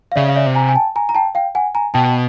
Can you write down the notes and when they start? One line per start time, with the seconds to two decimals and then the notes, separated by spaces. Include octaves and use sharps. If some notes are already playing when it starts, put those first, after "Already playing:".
0.12 F5
0.16 C#3 D5 E5
0.28 F5
0.36 D5 E5
0.46 C3
0.55 G#5 A#5
0.69 G#5
0.75 G5 A5
0.96 G#5 A#5
1.09 A#5
1.15 G5 A5
1.35 F5 G5
1.55 F#5 G#5
1.75 G#5 A#5
1.94 B2 G5 A5